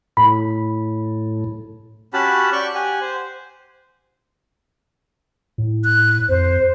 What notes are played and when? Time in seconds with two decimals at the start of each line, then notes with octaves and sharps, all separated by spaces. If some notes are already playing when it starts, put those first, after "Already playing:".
0.17 A2 B5
2.14 C#4 F#4 G4 F#5 A5 B5
2.53 D5 C#6 F#6 G6
2.75 G4 F#5 G#5
3.01 C5
5.58 A2
5.84 F#6
6.29 F2 C5